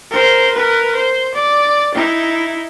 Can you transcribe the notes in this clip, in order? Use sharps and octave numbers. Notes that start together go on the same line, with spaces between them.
A#4 C5
A#4 B4
C5
D5
D#4 E4